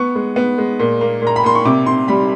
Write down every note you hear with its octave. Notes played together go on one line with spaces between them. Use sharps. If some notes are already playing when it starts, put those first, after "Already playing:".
Already playing: B3 C#6
G#3
B3
G#3
A#2
A#3
A#2
A#5
B5
A#2 C6
C#6
C3 D6
C3 C6
G3 B5